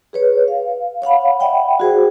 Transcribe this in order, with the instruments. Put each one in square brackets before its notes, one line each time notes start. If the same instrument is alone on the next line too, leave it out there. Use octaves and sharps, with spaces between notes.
[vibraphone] G#4 B4 C#5
F5
C#5 F5 F#5 B5
D5 E5 F#5 G5 B5
F#4 G#4 C5